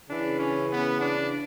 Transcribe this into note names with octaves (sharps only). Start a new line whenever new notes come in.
C#3 E3 D4
C#4
B3
D4